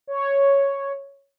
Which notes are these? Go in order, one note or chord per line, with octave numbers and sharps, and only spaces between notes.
C#5